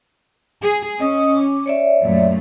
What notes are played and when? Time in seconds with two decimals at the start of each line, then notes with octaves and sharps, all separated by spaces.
0.61 G#4
1.00 C#4 D#5 D#6
1.37 D6
1.66 C#5 D5 E5
2.02 F#2 A#2 A3